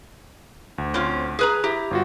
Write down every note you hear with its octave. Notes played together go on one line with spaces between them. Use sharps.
D2
C4 C#4 F4
G#4 B4 A#5
E4 G4 A#5
G1 F4 F#4